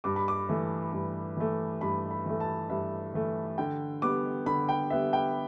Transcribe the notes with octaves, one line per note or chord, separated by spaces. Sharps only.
G2 D6
B5
D6
E3 A3
G2
E3 A3
G2 B5
B5
E3 A3
A5
G2 E5
E3 A3
D3 G5
G3 B3 D6
D3 B5
G5
G3 B3 E5
G5